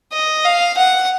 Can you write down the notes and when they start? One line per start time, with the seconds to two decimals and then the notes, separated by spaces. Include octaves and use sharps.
0.12 D#5
0.44 F5
0.77 F#5